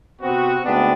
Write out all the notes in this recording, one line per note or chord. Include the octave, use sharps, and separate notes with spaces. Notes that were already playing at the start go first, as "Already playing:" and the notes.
C3 B3 C4 F#4
D2 G#2 B3 C4 D4 B4